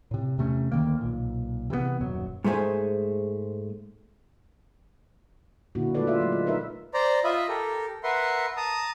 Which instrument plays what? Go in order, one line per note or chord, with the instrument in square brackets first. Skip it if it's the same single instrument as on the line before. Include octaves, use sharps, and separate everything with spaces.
[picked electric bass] A2 C3
E2 C3 A3 C#4
D2 D#3 A#3
B1 A#2
C3 E3 F#3 B3
D#1 F#2 F#3
[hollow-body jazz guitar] G#2 G#3 A3 C5 G#5
[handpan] A#2 D3 A#3 D4 E4 F#4
G#3 A3 F4 A4 B4 D5
F4 E5
F#3 G#3 A3
F4
D#4 A#4 B4 E5
[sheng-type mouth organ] C5 D5 A#5
F4 D#5 E5 B5
G4 A4 A#4
A#4 B4 E5 F#5 C6
A5 A#5 D#6